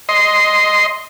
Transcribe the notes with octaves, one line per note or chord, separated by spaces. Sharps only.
D#5 C6